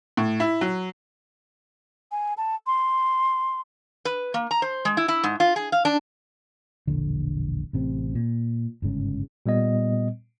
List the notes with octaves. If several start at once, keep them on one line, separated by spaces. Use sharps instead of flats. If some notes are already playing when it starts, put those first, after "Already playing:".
A2
E4
F#3
G#5
A5
C6
B4
A#3
A#5
C5
G#3
E4
E4
G#2
F4
G#4
F5
D4
E1 A#1 D3
A1 C3 C4
A#2
G1 G#2 C#3
A#2 G3 B3 D#5